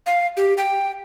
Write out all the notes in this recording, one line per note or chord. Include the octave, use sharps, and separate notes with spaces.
F5
G4
G5